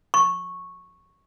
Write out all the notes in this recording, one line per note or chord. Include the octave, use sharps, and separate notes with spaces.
C#6